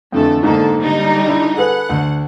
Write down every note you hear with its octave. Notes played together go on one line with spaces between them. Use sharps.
F2 D3 E3 A3 A4
G#2 D3 A#3 A4
D3 G3 D#4
D4 E4
G#4 A4 B4 F#5
D2